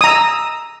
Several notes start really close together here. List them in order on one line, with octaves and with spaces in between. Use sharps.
D#6 A#5 E6